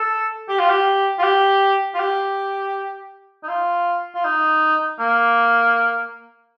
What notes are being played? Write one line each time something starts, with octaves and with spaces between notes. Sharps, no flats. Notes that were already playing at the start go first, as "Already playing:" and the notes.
Already playing: A4
G4
F4
G4
F4
G4
F4
G4
D#4
F4
F4
D#4
A#3